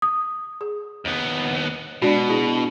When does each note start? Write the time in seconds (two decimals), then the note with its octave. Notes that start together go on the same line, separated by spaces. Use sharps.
0.02 D#6
0.61 G#4
1.05 D#2 B3
2.02 B2 G#3 D4 F#4 D5
2.29 D4 E4 G#4